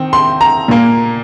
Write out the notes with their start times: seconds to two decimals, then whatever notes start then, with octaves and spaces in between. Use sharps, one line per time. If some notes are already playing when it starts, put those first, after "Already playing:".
Already playing: D#3 C4
0.13 C6
0.41 A#5
0.68 A#2 A#3